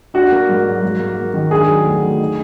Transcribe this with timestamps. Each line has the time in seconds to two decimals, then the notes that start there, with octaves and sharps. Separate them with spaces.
0.14 D4 F#4
0.32 A#3
0.49 G#2
0.66 F#3
0.83 G#2
1.00 A#3
1.16 G#2
1.34 D#3
1.51 D4 G#4
1.68 F#3
1.85 D2
2.03 D3
2.19 D#4